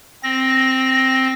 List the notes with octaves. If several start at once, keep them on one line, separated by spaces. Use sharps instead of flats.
C4 A#6